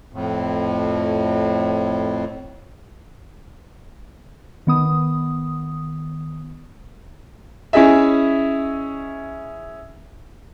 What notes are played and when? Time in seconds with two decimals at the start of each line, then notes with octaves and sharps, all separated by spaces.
0.13 F2 A2
4.67 D#3 B3 D#6
7.73 C#4 E4 G#4 D#5 E5